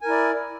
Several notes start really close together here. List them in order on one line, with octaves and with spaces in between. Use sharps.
G#5 A#4 E4 D5